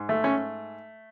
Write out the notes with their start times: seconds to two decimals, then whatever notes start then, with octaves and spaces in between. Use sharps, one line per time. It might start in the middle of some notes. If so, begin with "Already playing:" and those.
Already playing: G#2
0.09 A3
0.24 C#4